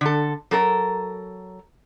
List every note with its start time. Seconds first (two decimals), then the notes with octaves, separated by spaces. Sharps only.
0.01 D3 A4
0.51 F#3 A4 A#4